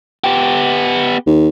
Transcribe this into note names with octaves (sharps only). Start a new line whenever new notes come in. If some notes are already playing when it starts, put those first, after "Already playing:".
B3 G4
D#2